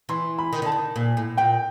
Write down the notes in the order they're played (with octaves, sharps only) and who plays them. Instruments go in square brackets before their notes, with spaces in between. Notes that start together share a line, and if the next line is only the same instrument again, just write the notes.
[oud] E3 [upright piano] C6
[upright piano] B5
[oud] D#3
[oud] D3 [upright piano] A5
[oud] D#3
A#2
A2
[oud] A#2 [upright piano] G5